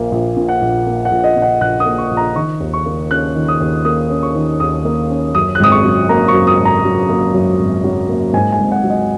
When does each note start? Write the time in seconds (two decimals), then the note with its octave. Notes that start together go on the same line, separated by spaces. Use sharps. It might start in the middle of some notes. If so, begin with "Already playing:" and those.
Already playing: A#1 A#2 A#3
0.12 A#1
0.37 A#2
0.48 F#5
0.62 A#1
0.86 A#3
1.05 F#5
1.11 A#1
1.24 D#5
1.36 A#2
1.42 F#5
1.61 A#1 F#6
1.80 D#6
1.86 A#3
1.98 C#6
2.11 A#1
2.17 A#5
2.36 D#3 C#6
2.60 D#2
2.73 C#6
2.86 A#3
3.11 C#4 F#6
3.35 D#3
3.48 D#6
3.60 D#2
3.85 A#3 D#6
4.10 C#4
4.23 C#6
4.35 D#3
4.60 D#2 D#6
4.85 A#3
5.10 C#4
5.34 F#2 D#6
5.55 F#6
5.60 G#1 D#6
5.72 C#6
5.85 F#3
6.09 A#3 A#5
6.28 C#6
6.34 F#2
6.47 D#6
6.59 G#1
6.65 A#5
6.85 F#3
7.09 A#3
7.34 F#2
7.59 G#1
7.84 F#3
8.09 A#3
8.33 G#2 G#5
8.52 G#5
8.59 G#1
8.72 F#5
8.84 F#3
8.90 D#5